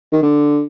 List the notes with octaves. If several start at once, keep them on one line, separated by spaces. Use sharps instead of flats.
D#3
D3